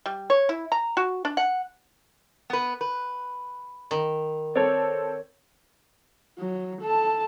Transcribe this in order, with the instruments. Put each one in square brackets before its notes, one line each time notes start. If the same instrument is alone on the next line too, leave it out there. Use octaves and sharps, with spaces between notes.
[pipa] G3
C#5
E4
A#5
F#4
D4
F#5
[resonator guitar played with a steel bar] B3 B4
B4
[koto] D#3
[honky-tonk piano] C4 A4 [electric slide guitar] C#5 D5
[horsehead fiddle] F#3
A4 A5